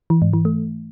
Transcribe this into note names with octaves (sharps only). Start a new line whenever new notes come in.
E3
G#2
E3
A3